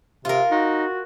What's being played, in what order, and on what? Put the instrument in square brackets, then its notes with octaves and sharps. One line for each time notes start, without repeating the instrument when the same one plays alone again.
[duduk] C3 [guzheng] F4 A#4
[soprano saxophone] D#4 [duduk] F#4